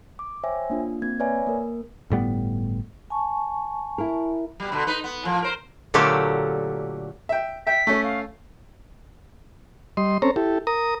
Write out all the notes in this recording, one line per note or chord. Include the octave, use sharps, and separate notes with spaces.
D6
C5 C#5 E5 G5 G#5
A#3 D4 F4
A#3 C4 G#6
B4 C#5 D5 E5 G#5
A#3 A#4
G1 A2 G3 B3
G#5 A5 C#6
E4 A#4
B2 G3
B2 D3
D#4 B4
B3
A2 F3 A#3
A#4 C5
A#2 D3 F#3 A3 A#3 G4
E5 G5
E5 G5 B6
A3 C#4
F5
G3 D#5 C6
C4 C#4 A4 C5 C#5 A#5
E4 G4 A4
A#4 A#5 D#6